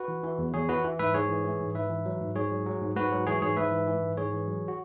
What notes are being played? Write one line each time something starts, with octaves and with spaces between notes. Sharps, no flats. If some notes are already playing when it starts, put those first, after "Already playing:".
Already playing: F#4 B4
E3
E3
E2
E2 G#4 C#5
E3 F#4 B4
E3
G#2 B4 E5
G#2 G#4 C#5
E3
E3
G#2
G#2 B4 E5
E3
F#3
G#2
G#2 G#4 C#5
F#3
F#3
G#2
G#2 F#4 B4
F#3
E3 G#4 C#5
G#2 G#4 C#5
G#2 B4 E5
E3
E3
G#2
G#2 G#4 C#5
E3
F#3
F#4